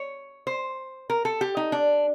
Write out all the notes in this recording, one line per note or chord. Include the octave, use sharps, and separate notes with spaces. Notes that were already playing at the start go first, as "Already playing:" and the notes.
Already playing: C#5
C5
A#4
A4
G4
D#4
D4